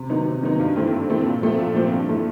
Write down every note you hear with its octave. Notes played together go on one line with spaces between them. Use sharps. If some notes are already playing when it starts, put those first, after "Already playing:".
Already playing: C3
D#3 F#3 B3 D#4
C3
D#3 F#3 B3 D#4
G2
E3 A3 C4
G2
E3 A3 C4
A#2
F3 A3 C4
A#2
F3 A3 C4
G2
E3 A3